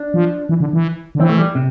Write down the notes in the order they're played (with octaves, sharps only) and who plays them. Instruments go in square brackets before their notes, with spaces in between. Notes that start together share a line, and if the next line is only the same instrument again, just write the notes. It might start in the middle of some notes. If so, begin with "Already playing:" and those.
Already playing: [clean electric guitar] D4
[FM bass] F3
E3
D3
E3
D3
[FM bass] E3 [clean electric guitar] C4
[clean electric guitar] A3
G3
C3